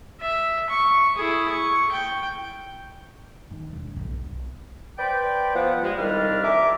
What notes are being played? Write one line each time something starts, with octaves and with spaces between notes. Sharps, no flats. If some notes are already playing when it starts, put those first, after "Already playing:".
E5
C#6
E4 G#4
C#6
G5
D#3
E1
B1
B4 C5 D5 G5
F3 B3 F#5
G2 G#3
C2 F2 D#3 G3 D4 F6
E5 G#5 A#5 D6